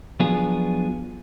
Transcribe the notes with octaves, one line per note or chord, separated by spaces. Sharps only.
F3 F#3 B3 D4 F4 G#4